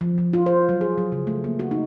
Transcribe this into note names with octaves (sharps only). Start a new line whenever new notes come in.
F3
F3
F4
C5
F#3
G#4
F#3
C#3
A3
A#3
F#4
D#4